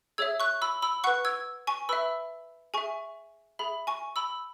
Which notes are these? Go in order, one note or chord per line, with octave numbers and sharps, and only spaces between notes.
G#4 C#5 E5 E6 G#6
C#6 F#6
B5 E6
B5 E6
B4 F#5 C#6 F#6
E6 G#6
G#5 C#6
B4 E5 B5 E6
G#4 E5 G#5 C#6
G#4 E5 B5
G#5 C#6
B5 E6